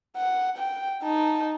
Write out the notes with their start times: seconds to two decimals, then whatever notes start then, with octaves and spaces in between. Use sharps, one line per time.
0.17 F#5
0.58 G5
1.03 D#4 A5